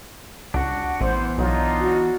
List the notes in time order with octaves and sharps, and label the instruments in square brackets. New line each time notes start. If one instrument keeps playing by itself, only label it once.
[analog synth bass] C#2 [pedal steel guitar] D4 F#4 [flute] F#5
[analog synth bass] A1 [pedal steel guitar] E3 B3 [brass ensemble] C5
[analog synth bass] B1 [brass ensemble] D4 D#4 F4 [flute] C#5
[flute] F#4